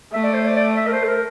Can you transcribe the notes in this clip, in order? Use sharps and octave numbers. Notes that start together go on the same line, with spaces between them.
A3 E5
D5
C5
D5
D5
E5
A#4
C5
A4
A#4